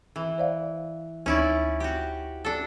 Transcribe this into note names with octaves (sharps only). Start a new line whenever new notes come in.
E3
C5 D5 F5
D2 C#4 D#4 E4 D5 C#6
F#4 G4
D4 A4